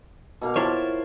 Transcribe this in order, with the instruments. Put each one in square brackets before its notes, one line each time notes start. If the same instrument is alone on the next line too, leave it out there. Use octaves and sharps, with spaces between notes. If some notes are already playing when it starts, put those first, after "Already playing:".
[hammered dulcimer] B2 A#3 F5
[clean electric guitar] E4 C5 C#5 [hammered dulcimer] F4 A#4 A5